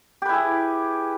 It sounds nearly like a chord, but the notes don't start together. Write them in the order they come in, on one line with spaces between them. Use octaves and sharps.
G4 B4 E4 G#4